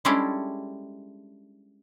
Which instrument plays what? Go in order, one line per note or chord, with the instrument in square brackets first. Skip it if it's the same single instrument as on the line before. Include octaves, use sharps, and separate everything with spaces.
[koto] G3 G#3 C#4 D4 E4 A4